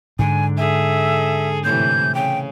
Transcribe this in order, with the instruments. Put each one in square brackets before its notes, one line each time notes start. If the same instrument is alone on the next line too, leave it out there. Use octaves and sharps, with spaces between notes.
[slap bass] G#2 D3 [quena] G#5
[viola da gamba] G#4 A4 [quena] E5
[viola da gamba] A2 C3 E3 [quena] G6
[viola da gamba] C#3 [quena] G5